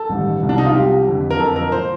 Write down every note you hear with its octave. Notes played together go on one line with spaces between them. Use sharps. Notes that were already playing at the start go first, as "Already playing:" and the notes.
Already playing: A4
A1 G2 D#3 G3
C2 C3 F3
D4
D#4
F4
C2 C3 F3 G4
F2 D3 F3
A#4
F2 D3 F3 A4
A#4
A#2 F3 C5